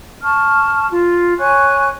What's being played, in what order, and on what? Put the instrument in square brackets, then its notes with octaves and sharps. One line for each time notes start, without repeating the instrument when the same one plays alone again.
[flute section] A5 C#6 F6
F4
C#5 G#5 C#6 F#6